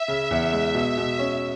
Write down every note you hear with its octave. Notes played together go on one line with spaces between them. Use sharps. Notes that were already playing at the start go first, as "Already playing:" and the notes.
Already playing: E5
C#3
E2
G#3
B2
B2
C#4